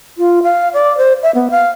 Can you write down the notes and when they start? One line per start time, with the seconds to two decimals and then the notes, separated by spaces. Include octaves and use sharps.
0.18 F4
0.43 F5
0.74 D5
0.98 C5
1.23 E5
1.35 B3
1.51 F5